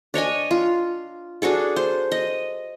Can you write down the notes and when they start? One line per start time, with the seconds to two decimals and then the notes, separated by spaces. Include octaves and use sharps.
0.14 D4 C#5 D#5 G#5
0.51 F4
1.42 D4 F#4 G#4 A4
1.76 C5
2.12 D#5